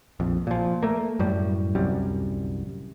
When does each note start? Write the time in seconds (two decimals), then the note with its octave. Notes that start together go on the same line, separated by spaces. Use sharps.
0.20 A#1 F2
0.47 A#2 F3
0.83 A3 A#3
1.19 F#2 A2 G3
1.75 D1 C2 F#2 G3